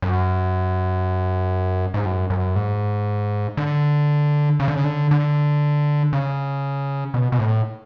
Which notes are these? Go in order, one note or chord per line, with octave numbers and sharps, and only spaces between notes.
F#2
G#2
F#2
F#2
G#2
D3
C#3
D3
C#3
D3
D3
C#3
B2
B2
A2